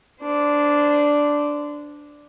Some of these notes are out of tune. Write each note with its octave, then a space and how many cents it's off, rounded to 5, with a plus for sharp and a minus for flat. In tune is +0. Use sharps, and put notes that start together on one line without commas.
D4 -5 C5 -25